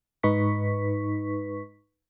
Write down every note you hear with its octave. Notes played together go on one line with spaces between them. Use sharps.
G#2 D#4 B4 C#6 B6